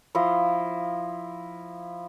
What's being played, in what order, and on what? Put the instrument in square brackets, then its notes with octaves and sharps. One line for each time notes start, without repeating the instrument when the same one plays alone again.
[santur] F3 E4 D#5 F5